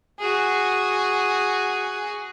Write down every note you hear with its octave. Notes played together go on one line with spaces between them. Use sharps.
F#4 G#4